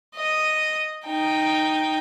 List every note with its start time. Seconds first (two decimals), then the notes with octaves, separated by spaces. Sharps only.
0.16 D#5
1.06 D#4 G5